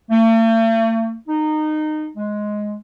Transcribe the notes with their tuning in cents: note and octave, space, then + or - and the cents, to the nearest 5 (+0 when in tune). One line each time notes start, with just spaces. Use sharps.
A3 +45
D#4 -20
G#3 +10